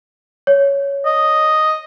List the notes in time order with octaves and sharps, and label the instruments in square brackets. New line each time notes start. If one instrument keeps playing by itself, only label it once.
[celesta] C#5
[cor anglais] D#5